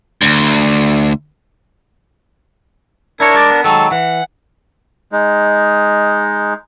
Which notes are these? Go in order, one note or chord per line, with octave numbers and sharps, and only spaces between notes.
D2
D4 E4 A#4 C#5
G#3 D5
B3
D#3 F#3 G#3 A4
E3 F#5
G#3 D#4